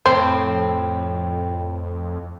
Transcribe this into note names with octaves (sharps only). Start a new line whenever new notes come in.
F2 A2 C4 C5